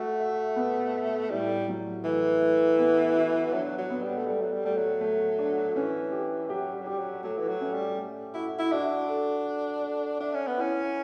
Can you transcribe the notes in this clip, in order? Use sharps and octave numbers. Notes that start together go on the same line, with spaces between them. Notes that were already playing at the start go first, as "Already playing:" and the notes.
Already playing: A3 F#4
E5
B3
E5
A2 G3
F#3
E3 A3
A3
B3
F#4
F#3 D4
F#3
B3
G3
A3
G3 A4
F#3
G3
G3 A3
F#3
A3
D4
E3 C#4
G4
F#3 G4
G3
F#3
G3 G4
F#3
F#3 A3
E3
F#3
C#4
G3
A3
E4 F#4
E4
D4 F#4
A4
A4
A4
D4 E5
C#4
B3
C#4 E4